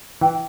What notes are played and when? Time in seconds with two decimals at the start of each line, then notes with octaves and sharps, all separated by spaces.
0.21 E3 G5